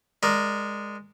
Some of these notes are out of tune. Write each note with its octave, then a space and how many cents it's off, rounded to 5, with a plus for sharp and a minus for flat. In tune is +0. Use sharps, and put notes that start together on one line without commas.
G#3 -5 A#4 +0 D5 +5